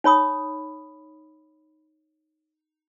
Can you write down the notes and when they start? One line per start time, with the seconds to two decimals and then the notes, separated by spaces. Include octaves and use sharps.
0.04 D#4 C#5 B5 D#6